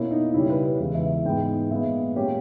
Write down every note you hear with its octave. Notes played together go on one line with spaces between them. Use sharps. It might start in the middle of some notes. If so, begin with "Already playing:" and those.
Already playing: B2 A#3 C#4 E4
D#4
C#3 G3 C#4 E4
B4
B4
E2 C#3 E3 G#3
E5
E5
G#2 E3 G#3 B3 G5
A#2 G#3 B3 E5
A#2 G#3 C#4 G4